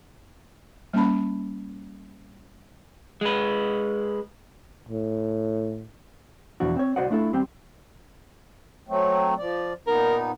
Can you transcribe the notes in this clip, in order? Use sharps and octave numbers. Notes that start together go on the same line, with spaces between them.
G3 A#3 C#4 A5 B5
G#3 B4
A2
E2 B2 F3 D4 F#4
C4 C#5
C2 F#4 C5 D5 D#5 F#5
A3 D4 E4 F4 A4
D#2 G3 C4 G4 G5
F#3 A3 C4
F3 D5
A#2 B3 D#4 A#4